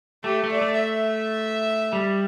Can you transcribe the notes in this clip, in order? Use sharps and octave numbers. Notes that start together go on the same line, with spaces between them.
A3 G4
A3
D5
A3
E5
G3